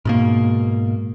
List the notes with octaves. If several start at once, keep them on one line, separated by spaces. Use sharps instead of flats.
G#2 B2 A#3